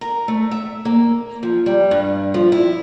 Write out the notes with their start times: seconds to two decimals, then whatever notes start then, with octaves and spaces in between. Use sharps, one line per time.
0.01 A#4
0.28 A3
0.51 E5
0.85 A#3
1.43 F3
1.66 G3
1.91 G2
2.34 F3
2.52 E4